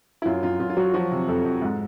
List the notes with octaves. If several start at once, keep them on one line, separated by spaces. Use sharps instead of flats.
E4
F#2 F4
F#2 F4
F#2 F4
F4
F#3 F#4
F3 F#4
C3
F2 A4
F2
G#2